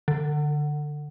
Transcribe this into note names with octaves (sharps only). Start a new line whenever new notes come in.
D3